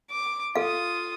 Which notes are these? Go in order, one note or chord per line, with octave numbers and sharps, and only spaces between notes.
D6
F4 A4 F5 D#6